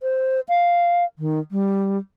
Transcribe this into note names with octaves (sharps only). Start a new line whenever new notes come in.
C5
F5
D#3
G3